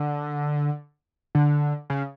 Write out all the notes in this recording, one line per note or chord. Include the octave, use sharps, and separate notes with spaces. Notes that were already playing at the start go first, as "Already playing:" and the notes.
Already playing: D3
D3
C#3